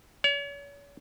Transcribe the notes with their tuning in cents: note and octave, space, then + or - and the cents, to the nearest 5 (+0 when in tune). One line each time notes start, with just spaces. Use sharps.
C#5 +40